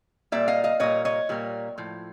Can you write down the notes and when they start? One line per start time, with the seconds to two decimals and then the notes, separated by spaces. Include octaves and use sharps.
0.32 A#2 G3 A#3 D5 E5
0.48 D#5 F5
0.64 D#5 F5
0.80 A#2 G3 A#3 C#5 D#5
1.05 C#5 D#5
1.29 A#2 G3 A#3
1.78 A2 F3